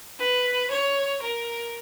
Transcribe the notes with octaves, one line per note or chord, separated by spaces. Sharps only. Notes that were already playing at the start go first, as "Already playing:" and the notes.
B4
C#5
A#4